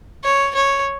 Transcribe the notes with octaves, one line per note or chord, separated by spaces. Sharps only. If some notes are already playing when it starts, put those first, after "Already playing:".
C#5
C#5